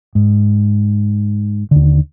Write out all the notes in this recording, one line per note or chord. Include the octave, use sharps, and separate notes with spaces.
G#2
D#2 D3